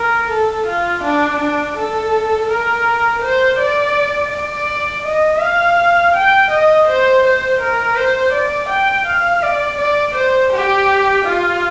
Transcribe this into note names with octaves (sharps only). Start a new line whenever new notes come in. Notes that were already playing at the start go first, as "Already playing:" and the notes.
Already playing: A#4
A4
F4
D4
D4
A4
A#4
C5
D5
D5
D#5
F5
G5
D#5
C5
C5
A#4
C5
D5
G5
F5
D5
D5
C5
G4
F4